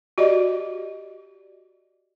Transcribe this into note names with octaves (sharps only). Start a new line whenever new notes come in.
F#4 G4 D5 D#5